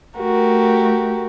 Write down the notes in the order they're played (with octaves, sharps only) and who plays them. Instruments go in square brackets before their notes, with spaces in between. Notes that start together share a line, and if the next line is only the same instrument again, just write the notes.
[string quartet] A3 F#4 G4 A#4